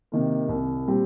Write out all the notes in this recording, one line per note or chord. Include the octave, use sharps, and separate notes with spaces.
C3 D#3 A#3
C2
A#2 G3 C4 G4